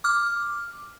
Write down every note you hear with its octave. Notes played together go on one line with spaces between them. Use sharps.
D6 F6